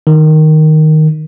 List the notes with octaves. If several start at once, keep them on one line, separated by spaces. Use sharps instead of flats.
D#3